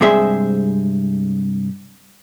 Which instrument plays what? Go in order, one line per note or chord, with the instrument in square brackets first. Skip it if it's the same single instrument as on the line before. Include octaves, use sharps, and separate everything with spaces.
[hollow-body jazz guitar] G2 C3 G#3 G#4 C5 E5